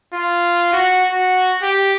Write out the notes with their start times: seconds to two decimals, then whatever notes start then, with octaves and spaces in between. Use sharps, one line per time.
0.14 F4
0.73 F#4
1.12 F#4
1.63 G4